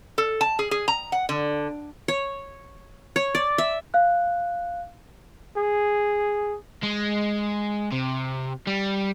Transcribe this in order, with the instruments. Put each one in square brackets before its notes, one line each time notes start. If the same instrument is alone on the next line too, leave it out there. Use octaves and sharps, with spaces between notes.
[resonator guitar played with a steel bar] A4
A5
G#4
G#4
A#5
F#5
D3
[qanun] C#5
C#5
D5
E5
[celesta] F5 F#6
[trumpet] G#4
[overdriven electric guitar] G#3
C3
G3